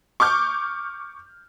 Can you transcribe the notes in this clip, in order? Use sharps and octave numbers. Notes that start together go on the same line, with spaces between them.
C#6 D6 F6 G6